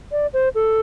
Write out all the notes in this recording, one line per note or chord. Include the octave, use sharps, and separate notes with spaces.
D5
C5
A4